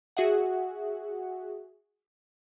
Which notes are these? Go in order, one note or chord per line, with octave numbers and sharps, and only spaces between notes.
F#4 G#4 E5 F#5